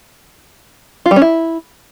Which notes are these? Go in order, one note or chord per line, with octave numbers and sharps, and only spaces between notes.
F4
G3
C#4
E4